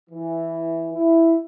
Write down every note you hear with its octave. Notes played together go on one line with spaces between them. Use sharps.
E3
E4